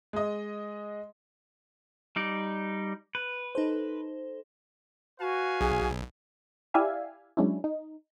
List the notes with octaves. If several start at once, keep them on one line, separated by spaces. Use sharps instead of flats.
G#3 D#5
G3 D#4 D5
B4
D#4 A4 C5
F#4 B4 F5 G#5
B1 G#4
E4 G4 D5 E5 F5 G#5
F#3 G#3 C#4 D4 E4
D#4